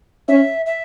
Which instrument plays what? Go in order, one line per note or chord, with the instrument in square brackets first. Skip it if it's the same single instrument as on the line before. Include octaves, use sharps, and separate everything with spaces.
[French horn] C#4 [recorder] E5
[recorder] E5